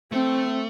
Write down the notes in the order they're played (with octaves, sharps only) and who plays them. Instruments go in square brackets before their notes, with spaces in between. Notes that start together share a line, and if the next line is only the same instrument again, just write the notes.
[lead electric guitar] A3 [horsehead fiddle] C4